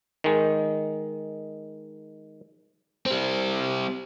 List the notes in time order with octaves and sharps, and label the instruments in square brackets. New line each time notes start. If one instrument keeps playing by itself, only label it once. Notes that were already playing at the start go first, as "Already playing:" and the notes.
[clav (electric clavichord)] D#3 G#3
[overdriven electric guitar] G3 C4